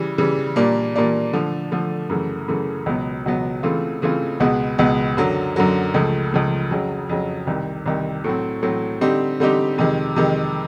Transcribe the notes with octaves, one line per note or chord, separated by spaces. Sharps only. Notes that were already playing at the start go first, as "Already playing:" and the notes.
Already playing: C#3 E3 G3
C#3 E3 G3
A#2 G3 A#3 D4
A#2 G3 A#3 D4
D3 F3 A3
D3 F3 A3
F#2 C#3 E3 A3
F#2 C#3 E3 A3
C#2 B2 F#3 B3
C#2 B2 F#3 B3
C#3 E3 A3 C4 F4
C#3 E3 A3 C4 F4
C#2 B2 G#3 B3
C#2 B2 G#3 B3
F#2 D3 F#3
F#2 D3 F#3
C#2 C#3 F3 A3
C#2 C#3 F3 A3
F2 C#3 F#3
F2 C#3 F#3
C2 C3 D#3
C2 C3 D#3
A2 F#3 A3 C4
A2 F#3 A3 C4
D3 G3 C4 D#4 G4
D3 G3 C4 D#4 G4
F2 C3 D#3 G#3
F2 C3 D#3 G#3